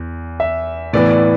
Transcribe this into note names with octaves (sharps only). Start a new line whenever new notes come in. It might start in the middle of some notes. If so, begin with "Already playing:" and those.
Already playing: E2
E5
A2 E3 B3 D5
D5